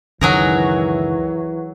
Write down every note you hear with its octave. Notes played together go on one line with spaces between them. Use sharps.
C#2 F#2 D#3 E3 F#3 G#4 A#4